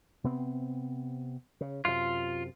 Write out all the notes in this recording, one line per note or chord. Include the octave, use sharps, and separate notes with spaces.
C3 B3 C4
C#3
F#2 C3 F4